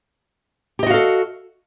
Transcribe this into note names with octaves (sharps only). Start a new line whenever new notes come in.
F#4 G4 A4 D#5 F5